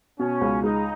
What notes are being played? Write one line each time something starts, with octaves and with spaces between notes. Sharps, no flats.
B2 C#4
C#2
G#3 D#4